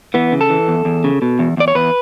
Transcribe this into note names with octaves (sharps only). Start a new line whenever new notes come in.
E3 B3
C#3
A4
E3
E2
E2
C#3
B2
E2
E2 D5
C#5
E2 B4